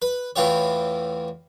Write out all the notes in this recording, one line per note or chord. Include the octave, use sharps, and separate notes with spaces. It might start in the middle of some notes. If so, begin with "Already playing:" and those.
B4
E2 A2 E3 F4 G4 C#5